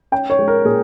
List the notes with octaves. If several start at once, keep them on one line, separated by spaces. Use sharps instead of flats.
C#4 G5
C#5
G#3
A#4
A#2 G#4